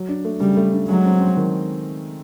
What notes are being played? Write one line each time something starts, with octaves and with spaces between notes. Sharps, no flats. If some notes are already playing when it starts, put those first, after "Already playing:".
Already playing: F#3
D4
A3
C#3 G3
A3
D4
F#3 G#3
C4
C4
D#3